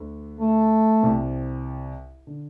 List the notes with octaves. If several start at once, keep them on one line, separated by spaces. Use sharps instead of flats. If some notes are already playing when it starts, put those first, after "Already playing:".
Already playing: D2 D3
A3
C2 C3
D3